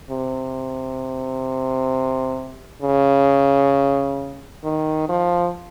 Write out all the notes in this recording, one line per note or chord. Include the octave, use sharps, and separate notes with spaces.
C3
C#3
D#3
F3